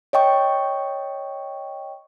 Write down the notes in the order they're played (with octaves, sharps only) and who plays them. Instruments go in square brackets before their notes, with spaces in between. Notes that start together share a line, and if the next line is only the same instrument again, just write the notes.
[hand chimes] C#5 D#5 G5 C#6